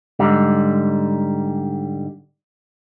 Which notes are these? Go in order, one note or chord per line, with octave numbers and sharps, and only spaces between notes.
G#2 D3 G3